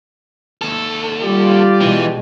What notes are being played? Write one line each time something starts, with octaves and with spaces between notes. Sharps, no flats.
D#2 A4
G3 F4 G4 D5
B2 E3 G#3